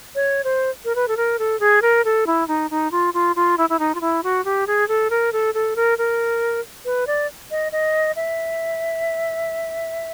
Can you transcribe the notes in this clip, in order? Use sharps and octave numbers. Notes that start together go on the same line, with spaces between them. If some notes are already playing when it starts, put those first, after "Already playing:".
C#5
C5
A#4
B4
A4
A#4
A4
G#4
A#4
A4
E4
D#4
D#4
F4
F4
F4
E4
E4
D#4
F4
E4
F#4
G4
G#4
A4
A#4
A4
A4
A#4
A#4
B4
D5
D#5
D#5
E5